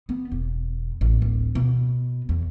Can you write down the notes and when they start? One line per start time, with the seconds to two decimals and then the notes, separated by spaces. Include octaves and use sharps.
0.09 B3
0.32 E1
1.01 A1
1.22 D1
1.55 B2
2.29 E2